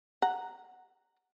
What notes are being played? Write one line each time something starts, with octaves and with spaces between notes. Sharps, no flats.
F#5 A#5